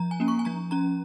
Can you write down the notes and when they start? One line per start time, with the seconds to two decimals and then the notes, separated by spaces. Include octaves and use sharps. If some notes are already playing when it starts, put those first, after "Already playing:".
Already playing: F3 A#5
0.11 G#5
0.20 A#3 C#4
0.28 C#6
0.39 G#5
0.45 F3 A#5
0.71 C#4 A#5